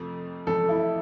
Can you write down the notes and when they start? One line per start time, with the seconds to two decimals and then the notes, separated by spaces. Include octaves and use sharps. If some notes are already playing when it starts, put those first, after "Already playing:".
Already playing: F2 C3 F3 A3
0.47 F2 C3 F3 A3 A4
0.69 E4